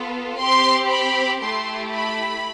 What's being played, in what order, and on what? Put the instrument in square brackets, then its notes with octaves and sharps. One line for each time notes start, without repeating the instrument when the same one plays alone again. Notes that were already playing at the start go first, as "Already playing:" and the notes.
Already playing: [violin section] B3 F4 A4
C4 G4 C6
B5
A3 E4 G4 C6
B5